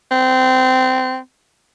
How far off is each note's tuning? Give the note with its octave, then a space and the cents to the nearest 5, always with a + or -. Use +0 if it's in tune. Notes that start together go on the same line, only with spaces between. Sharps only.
C4 -20